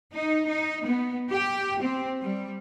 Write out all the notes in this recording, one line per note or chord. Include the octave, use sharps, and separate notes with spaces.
D#4
D#4
B3
G4
C4
G3